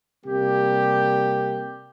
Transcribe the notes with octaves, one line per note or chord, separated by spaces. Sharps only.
C3 G3 A#3 G4